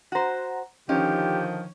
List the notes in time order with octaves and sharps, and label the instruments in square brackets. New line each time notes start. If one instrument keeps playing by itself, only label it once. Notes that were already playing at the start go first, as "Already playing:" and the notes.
[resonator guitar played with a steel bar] F#4 C5 [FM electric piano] F#5 A#5
[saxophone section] D3 D#3 F3 [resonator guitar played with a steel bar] C#4 [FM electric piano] D#4 [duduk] G4